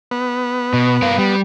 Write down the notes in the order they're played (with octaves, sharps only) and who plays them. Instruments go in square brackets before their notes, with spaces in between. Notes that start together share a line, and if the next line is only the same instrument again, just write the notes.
[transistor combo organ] B3
[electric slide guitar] B2
G2 A#4 F5
G3